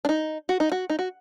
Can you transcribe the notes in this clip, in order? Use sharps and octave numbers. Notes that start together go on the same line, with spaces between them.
D4
D#4
F#4
D#4
F#4
D#4
F#4